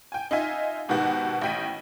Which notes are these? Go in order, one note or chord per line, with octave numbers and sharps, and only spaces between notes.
G5 G#5
D#4 F4 E5 G#5
G#2 B2 D#3 B3 F#4 G4
A1 D#5 G5 B6 D#7